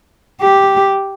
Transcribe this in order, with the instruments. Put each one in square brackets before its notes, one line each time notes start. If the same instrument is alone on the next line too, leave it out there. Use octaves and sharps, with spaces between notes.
[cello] G4